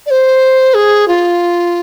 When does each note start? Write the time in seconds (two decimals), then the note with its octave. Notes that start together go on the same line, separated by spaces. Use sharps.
0.06 D5
0.11 C5
0.74 G#4
1.08 F4